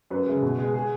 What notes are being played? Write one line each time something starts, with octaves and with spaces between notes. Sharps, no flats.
F#2 B4
C#3 G#3
B2
G#3
G#4